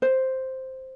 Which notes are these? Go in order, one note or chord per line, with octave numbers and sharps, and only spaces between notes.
C5